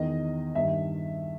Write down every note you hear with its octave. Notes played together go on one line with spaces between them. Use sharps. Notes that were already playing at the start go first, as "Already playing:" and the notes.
Already playing: E2 D#3 D#5
G2 D#3 E5